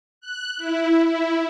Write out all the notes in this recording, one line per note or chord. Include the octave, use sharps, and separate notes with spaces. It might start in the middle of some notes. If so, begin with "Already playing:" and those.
F#6
E4
E4